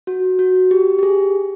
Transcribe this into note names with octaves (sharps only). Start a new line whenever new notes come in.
F#4
F#4
G4
G4
G#4